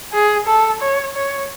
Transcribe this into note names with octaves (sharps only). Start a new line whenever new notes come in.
G#4
A4
C#5
C#5